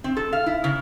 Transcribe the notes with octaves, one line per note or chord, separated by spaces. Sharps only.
C4
A4
F5
E4
C#3